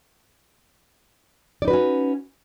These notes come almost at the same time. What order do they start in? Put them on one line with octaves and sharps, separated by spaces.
D5 D#4 B4 F#4 C#4